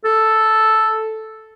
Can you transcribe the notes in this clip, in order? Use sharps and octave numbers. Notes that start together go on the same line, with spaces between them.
A4